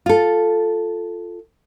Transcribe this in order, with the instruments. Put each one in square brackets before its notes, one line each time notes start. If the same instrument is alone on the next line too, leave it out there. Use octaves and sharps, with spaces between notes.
[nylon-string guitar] F4 A4